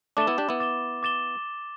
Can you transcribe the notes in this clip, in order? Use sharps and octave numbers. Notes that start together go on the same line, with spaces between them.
A3 D4 D6 A6 E7 G7
B3 E4
D4 G4
B3 E4
D6 A6 E7 G7
D6 A6 E7 G7